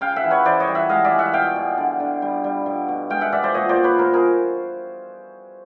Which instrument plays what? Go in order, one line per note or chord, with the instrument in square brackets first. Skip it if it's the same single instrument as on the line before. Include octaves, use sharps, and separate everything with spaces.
[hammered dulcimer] C#3 F5 G5
E5 F#5
E3
B4 C#5
E3 C5 D5
C#5 D#5
G3
E5 F#5
G#3 D#5 F5
D5 E5
G#3
E5 F#5
B2 F5 G5
B2
D3
D3
G3
G3
B2
B2
G#3 F5 G5
E5 F#5
B2 D5 E5
C5 D5
A#2 C#5 D#5
C5 D5
A#2
B4 C#5
A#2 A#4 C5
G#4 A#4